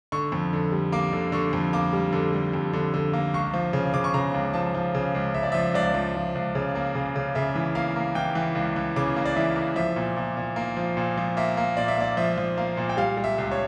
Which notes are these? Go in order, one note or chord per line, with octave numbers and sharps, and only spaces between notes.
D3 C#6
F2
D3
G3
A#3 D6
D3
D3 C#6
F2
A#3 D6
G3
D3
G3
F2
D3
D3
A#3
C#2 C#6
F3
C#3
C#3 D6
C#6
C#3 A#5
C#2
F3 A5
F3
C#3
C#2
C#3 E5
D5
F3 E5
C#2 D5
F3
F3
C#2
C#3
A#3
C#3
C#3
C#3 E5
E3
A#3 F5
A#3
E3 G5
E3
C#2
E3
C#3 D6
A#3
D5
E3 E5
A#3
F3 E5
A#2
A#2
A#2
A#3
F3
A#2
F3
A#3 E5
A#3
A#2 D5
E5
A#3 D5
F3 E5
F3
A#3 F5
A#2
G5
G3 F5
G3
E5
C#2
C#5